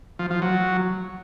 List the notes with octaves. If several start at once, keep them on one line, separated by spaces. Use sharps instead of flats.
F3
F3
F#3